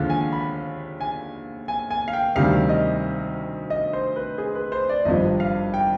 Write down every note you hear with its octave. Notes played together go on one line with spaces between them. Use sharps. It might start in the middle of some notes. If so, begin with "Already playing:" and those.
Already playing: D#2 D3 F3 G#3 F5
G#5
B5
G#5
G#5
G#5
F5
G5
D2 C3 D#3 G3 F5
D#5
D#5
C5
B4
G#4
B4
C5
D5
G#1 G2 F3 D#5
F5
G5